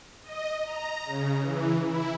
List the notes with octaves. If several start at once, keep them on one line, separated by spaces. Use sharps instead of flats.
D#5
A#5
C#3
E3
E4